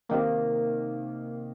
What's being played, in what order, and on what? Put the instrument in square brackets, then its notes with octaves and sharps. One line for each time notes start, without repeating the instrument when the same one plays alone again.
[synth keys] C3 D#3 A#3